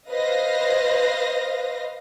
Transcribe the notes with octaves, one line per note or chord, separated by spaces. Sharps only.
B4 C5 D#5 F5 A#6